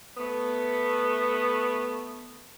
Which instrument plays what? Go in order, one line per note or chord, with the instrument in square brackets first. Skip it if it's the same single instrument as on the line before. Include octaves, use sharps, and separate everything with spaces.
[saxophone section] A3 B3